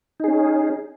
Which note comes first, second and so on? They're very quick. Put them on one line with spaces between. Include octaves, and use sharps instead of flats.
D#4 G#4 C#4